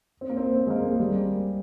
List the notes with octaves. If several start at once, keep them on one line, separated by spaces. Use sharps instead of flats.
C4
A#3
C4
C4
G#3
A#3
G#3
G3